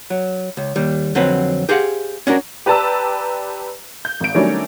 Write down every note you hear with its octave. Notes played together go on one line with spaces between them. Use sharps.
F#3
C#2
D#2 G3
F2 D3 F#3 C4 B4
G4 G#4 C5 F5 F#5
C#4 D4 F#4 A#4
G4 B4 D5 A5 A#5 E6
G6
G#1 D7
D#3 F#3 G3 A3 C#4 D4